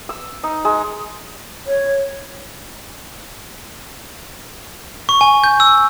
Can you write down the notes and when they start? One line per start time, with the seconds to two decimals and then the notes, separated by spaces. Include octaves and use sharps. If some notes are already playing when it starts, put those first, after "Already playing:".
0.09 E6
0.44 D#4
0.65 G#3
1.67 C#5
5.09 C#6
5.21 G#5
5.44 G6
5.60 E6